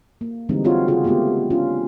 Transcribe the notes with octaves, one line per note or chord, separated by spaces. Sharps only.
A#3
D3 E3 G3 G#3 C4 D#4
C4 F4 F#4 C#5
C#3 F4 F#4 G#4
G#3 A3 B3 F4 G4
C#4 D4 F4